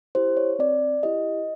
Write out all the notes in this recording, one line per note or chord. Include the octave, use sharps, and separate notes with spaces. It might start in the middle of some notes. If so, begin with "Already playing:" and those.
E4 G4 C5
C#5
C4 D5
E4 G4 D#5